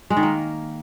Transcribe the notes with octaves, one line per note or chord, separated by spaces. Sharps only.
G#3
D#3
A#3